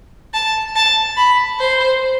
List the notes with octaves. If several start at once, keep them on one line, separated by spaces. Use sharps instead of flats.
A5
A5
B5
C5